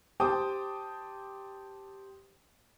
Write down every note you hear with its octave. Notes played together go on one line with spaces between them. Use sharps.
G4 C5 G5 A5 D6 D#6